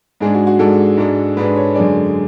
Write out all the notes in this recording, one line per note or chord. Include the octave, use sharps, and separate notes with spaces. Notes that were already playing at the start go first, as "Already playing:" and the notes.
G#2 G#3 D4 G#4
F#4
F#4
G#2 G#3 D4 A4
G#2 G#3 D4
G#2 G#3 D4 B4
C#5
F#2 D3 G#3 D5